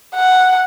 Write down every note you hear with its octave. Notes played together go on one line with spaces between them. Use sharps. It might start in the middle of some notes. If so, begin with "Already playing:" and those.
F#5